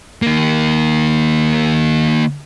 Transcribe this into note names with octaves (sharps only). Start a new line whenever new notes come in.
D#3 A#3